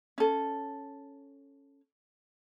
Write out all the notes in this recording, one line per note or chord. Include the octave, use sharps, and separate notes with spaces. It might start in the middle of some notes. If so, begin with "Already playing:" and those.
C#4 A4